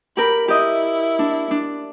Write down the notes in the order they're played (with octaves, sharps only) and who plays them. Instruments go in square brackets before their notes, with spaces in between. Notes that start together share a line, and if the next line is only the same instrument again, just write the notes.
[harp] G4 A#4 [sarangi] B5
[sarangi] E4 [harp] G4 D#5
[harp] D4
D4